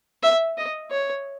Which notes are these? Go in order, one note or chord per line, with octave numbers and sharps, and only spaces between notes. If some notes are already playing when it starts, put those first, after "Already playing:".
E5
D#5
C#5